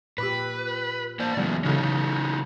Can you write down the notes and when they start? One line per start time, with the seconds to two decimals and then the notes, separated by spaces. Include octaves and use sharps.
0.18 A#2 G4 B4 B5 D6 E6
1.19 A#3 C5 D5
1.37 C#3 E3 F#3 G#3 A3 B3
1.65 C#3 E3 C#4 D#4 F#4 A4